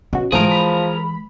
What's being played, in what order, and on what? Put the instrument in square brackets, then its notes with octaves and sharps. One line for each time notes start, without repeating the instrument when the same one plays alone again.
[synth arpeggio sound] B2 F#4 [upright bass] C#4
[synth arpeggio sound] G#2 A3 D7 [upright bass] E3 G#3 [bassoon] F3 [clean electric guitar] G#4 A#4
[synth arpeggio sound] B5